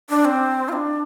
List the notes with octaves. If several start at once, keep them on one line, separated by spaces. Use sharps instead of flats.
D4
C4
F4
D4